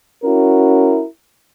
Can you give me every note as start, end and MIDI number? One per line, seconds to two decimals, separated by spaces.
0.25 1.04 61
0.25 1.04 64
0.25 1.04 66
0.25 1.04 70